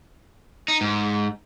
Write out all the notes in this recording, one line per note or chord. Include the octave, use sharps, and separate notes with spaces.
D#4
G#2